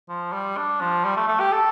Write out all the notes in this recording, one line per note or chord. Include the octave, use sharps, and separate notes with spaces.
F3
G3
D4
F3
G3
A3
A3
G4
A4